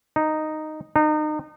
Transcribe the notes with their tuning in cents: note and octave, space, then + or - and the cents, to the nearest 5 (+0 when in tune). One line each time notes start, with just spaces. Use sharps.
D#4 -5
D#4 -30